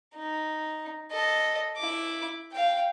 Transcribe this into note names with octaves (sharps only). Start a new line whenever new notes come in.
D#4
A4 D#5
E4 D6
F5 G5